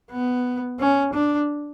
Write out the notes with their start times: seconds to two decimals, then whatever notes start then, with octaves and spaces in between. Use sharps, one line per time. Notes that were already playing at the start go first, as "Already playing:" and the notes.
0.11 B3
0.79 C#4
1.14 D4